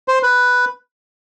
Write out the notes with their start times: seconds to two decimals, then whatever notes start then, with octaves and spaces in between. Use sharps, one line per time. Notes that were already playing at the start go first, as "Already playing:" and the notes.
0.08 C5
0.23 B4